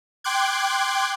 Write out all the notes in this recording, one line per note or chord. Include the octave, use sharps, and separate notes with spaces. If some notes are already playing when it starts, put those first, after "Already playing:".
G5 C6 D6 F#6 G#6